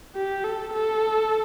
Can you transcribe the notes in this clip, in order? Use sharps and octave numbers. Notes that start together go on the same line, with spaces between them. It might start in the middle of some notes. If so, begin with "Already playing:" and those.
G4
A4
A4